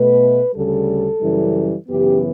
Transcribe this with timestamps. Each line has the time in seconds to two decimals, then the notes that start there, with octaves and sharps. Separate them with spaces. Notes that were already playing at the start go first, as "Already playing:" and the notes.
Already playing: B2 A3 B4
0.54 D2 C#3 G3 A4
1.21 F#2 C#3 E3 G3
1.88 F#2 C#3 E3 B3 G4